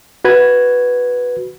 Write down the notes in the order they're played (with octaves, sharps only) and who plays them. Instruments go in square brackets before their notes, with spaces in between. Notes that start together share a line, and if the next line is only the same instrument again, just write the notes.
[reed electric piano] F#4 B4 G#6